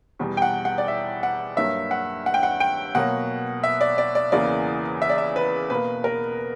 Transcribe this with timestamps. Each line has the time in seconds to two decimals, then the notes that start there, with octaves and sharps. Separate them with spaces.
0.19 E2 B2 G3
0.37 G5
0.42 F#5
0.65 F#5
0.78 D5
0.88 E5
1.23 F#5
1.57 G2 F#3 A#3 E5
1.91 F#5
2.26 F#5
2.34 G5
2.43 F#5
2.60 G5
2.95 B2 F#3 A#3 F#5
3.64 E5
3.81 D5
3.98 D5
4.15 D5
4.32 E2 C#3 E3 A#3 D5
5.02 E5
5.10 D5
5.18 E5
5.36 B4
5.70 B2 A#3 B4
6.04 A#4